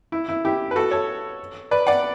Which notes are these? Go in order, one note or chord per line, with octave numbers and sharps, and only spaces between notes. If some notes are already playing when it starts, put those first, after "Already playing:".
E4
E4
E4 G4
B4
F#4 A4
A4 C#5
B4 D5
D5 F#5